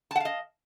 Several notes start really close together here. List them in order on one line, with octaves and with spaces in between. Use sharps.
A5 F#5 F5 D#5